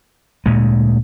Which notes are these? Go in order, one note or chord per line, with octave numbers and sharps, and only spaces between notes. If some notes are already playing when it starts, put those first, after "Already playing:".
D2 A#2 G#3